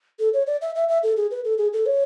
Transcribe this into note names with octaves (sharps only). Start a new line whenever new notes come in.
A4
C#5
D5
E5
E5
E5
A4
G#4
B4
A4
G#4
A4
C#5